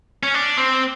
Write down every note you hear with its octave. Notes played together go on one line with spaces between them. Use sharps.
C#4
D4
C4